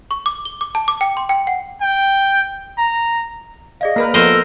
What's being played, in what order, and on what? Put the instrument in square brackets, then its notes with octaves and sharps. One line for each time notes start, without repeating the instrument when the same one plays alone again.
[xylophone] C#6
D6
G7
D6
A5
D6
G5
C6
G5
F#5
[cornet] G5
A#5
[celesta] G#4 D5 F5 [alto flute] D#5
[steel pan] A#3 A#4 B4
[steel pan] F3 B3 [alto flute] A4 [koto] A#4 C5 D#5